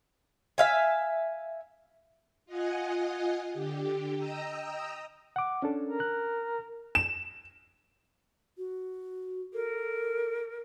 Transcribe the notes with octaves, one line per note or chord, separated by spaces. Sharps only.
E5 F5 G#5
F4 D#5 F#5 G#5
D3 G4
D#5 G5 A#5 D#6 E6
F#5 D6
C#4 D4 A4
A#4
F#6
E7
F#4
A4 A#4